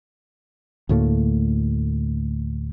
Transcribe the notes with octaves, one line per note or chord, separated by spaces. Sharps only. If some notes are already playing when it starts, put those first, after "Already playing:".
D2 A2 A3 A#3